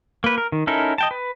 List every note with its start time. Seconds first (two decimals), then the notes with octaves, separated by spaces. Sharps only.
0.24 A#3 B4
0.38 A#4
0.52 D#3
0.67 C#4 D#4 E4 A4 A#4
0.98 D#5 G5 A5
1.11 B4